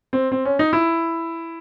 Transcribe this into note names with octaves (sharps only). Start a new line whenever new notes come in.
C4
C4
C#4
D#4
E4